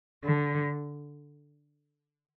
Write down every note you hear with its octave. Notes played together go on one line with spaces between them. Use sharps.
D3